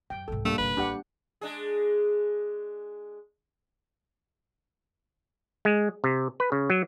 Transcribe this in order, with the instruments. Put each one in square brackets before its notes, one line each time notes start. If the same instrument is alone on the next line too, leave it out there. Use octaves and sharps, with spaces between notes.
[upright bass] F#2 [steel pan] G5
[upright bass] C2 G#2 [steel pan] A4
[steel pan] G3 A#3 D4 [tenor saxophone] A3
[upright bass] F#1 B1 [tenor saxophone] B4
[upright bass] A1 G3 [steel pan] D4 G4 F#5
[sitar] G#3 D4 G#4
[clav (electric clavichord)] G#3
C3
B4
C#3
F#3